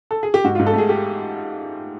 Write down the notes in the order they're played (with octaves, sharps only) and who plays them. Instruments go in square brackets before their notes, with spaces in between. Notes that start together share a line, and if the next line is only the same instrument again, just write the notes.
[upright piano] A4
G#4
G4
G#2 F#4
G#2 F4
A4
A3 G#4
G4